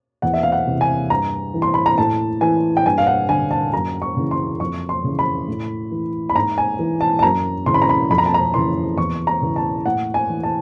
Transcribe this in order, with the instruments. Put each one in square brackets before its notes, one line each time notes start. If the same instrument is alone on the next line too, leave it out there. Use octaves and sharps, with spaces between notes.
[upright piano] E2 F#5
E5
F5
F#5
C3 E3
G#5
G2 A#5
E3
C6
B5
A#5
A2 A5
E3 G#5
G5
G2 G#5
F5
F#5
D3 G#5
A5
F#2 A#5
C#6
C#3 E3
C6
F2 C#6
C6
C#3 E3
B5
A2
E3
B5
G#2 A#5
G#5
E3
A5
A5
F#2 A#5
C#3 E3 C6
B5
A#5
B5
F2 B5
A#5
A5
A#5
C#3 E3 C6
E2 C#6
A#5
C#3 E3
A5
A2 F#5
G#5
E3
A5